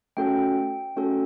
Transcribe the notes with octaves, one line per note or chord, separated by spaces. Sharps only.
A3 C#4 F#4 A4 G5
A3 C#4 F#4 A4